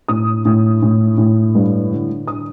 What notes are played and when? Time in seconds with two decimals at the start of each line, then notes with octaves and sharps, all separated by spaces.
0.08 A2 D#6
0.45 A2
0.82 A2
1.18 A2
1.55 G2
1.91 D3
2.27 D3 D#6